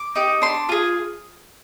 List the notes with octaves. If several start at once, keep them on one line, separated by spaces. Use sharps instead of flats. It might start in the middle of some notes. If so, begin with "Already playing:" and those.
Already playing: D6
D#4 G4
D4 C6
F4 G#4